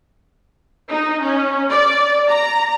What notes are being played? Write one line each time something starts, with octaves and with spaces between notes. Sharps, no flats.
D#4
C#4
D5
A#5